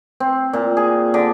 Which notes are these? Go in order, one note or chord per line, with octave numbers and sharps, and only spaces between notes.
C4
A#2
G#4
D3